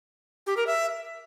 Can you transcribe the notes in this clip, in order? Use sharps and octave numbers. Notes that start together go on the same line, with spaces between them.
G4
A#4
E5